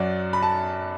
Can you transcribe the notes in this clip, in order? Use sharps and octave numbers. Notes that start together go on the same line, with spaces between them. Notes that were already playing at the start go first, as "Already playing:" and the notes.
Already playing: F#2 F#3 D5 F#5
B5
A5